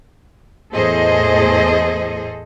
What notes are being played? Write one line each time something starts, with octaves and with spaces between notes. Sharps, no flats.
E2 A2 G#4 A4 C5 D#5